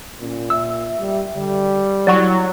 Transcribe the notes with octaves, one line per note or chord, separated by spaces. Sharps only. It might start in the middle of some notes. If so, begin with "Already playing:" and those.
A#2 C#4
E5 E6
G3
D3 G3
F#3 E4 D5 F#5 C#6